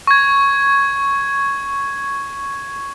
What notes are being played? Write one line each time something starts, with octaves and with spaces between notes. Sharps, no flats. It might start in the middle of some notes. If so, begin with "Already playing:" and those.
C#6 G#6